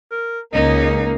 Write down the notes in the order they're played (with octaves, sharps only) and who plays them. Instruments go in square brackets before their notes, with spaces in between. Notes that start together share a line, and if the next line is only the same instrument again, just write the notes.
[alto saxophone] A#4
[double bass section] C#2 [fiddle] A#3 [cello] C#4 D#4 [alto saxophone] D#5